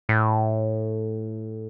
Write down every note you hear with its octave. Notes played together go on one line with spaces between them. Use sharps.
A2